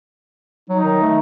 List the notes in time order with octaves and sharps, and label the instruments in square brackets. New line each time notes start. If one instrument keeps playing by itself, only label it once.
[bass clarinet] F#3 [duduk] D#4
[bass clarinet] D#3
A3